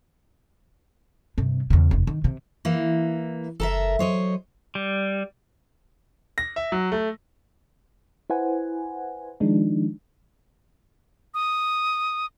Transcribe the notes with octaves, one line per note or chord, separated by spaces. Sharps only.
G2 C3
E2 C#3
F1 D#2
D#3
C3
E3 A#3
F#1 A4 A#4 E5
F#3 C5 C#5 D#5
G3
A#6
E5
F#3
A3
E4 B4 C5 F#5 G#5
D#3 F3 G#3 D4 D#4
D#6